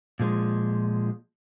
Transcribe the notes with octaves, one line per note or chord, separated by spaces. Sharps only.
A#2 F3 G#3